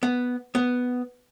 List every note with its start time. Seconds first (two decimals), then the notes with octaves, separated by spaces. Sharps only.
0.03 B3
0.55 B3